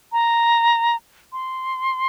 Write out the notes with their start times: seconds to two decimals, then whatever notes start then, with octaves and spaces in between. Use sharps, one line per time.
0.12 A#5
1.33 C6